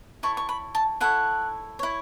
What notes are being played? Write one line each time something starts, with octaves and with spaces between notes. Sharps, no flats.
E4 A4 C#5 C#6
C#6
B5
A5
E4 A4 C#5 F#5
E4 C#5